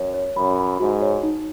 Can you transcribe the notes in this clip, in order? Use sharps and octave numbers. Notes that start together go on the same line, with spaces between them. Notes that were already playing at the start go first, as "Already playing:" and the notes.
Already playing: F#2 C#5
C#5
F#2 B5
B5
G#2 F#4
C#5
D#4